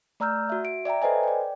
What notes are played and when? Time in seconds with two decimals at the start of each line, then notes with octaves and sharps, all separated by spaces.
0.20 A3 D5 A#5 E6 F6 G6
0.50 F#4 E5
0.65 D7
0.85 D5 E5 G5 A#5
1.02 A4 B4 C5 D#5 G#5
1.23 D5 G5